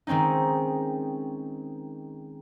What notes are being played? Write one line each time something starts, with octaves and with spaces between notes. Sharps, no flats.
D#3 G#3 C4 C#4 D#4